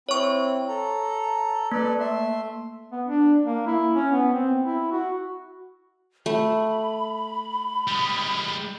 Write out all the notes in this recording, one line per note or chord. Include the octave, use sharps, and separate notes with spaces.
C4 E4 C#5 C#6
A4 A#5
A#3 A4 B4 D5
A3 E5 C6
B3
D4
A#3
E4
C#4
B3
C4
E4
F#4
A3 B5
G3 G#3